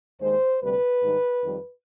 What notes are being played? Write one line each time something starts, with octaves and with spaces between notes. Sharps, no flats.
D#2 D#3 G#3 C5
D2 C3 G3 B4
G#2 D#3 G3
F2 D#3 G3